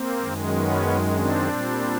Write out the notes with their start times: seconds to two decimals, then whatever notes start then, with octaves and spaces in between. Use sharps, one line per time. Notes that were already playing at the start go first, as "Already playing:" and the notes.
Already playing: A#3 C4
0.20 F#2 D#3 G#3
0.52 B3 C#4
1.16 C4 D4
1.48 A#2 G3